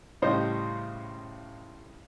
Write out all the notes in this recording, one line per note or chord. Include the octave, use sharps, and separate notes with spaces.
A2 C#3 G3 C5 D#5